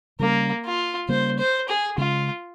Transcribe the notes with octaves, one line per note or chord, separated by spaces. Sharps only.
C#3 G3 A#3 C#4
F4
C#3 G3 A#3 C#4 C5
C5
G#4
C#3 G#3 C#4 F4